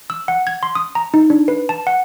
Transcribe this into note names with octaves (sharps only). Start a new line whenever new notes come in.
E6
F#5
G#6
C6
D#6
A#5
D#4
D4
B4
A5
F#5